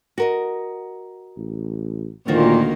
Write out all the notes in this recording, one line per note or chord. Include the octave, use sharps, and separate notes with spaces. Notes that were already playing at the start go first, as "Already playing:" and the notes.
F#4 A#4 D#5
A1
D2 A#2 D#3 A#3 F4 F#4 C5